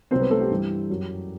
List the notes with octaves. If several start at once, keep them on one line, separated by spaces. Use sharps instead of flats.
C2 C3 F#3 C4 C5
B3 B4
A3 A4
G4
G2 E3 G3
F#2 F#3